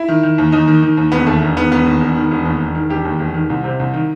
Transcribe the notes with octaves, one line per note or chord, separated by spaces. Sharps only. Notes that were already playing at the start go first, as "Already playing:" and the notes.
Already playing: E4
D#3
D#3
D#2
D#2 D#4
D#3
D#3
D#2
E1 B3
D#2 A3
E1
D#3 B3
E1 B3
D#2
E1
D#3
E1
D#2
E1
D#3
E1 G4
D#2
E1
D#3
C2
C3
C2
D#3